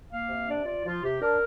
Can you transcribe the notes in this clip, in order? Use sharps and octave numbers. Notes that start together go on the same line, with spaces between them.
A#3 F5
C3
D4 D5
F4 D5
F3 F4
C3 G4
D4 A#4